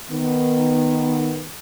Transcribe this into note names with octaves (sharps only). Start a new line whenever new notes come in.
D#3 B3